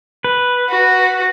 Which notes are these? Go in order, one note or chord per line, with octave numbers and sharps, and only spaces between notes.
B4
F#4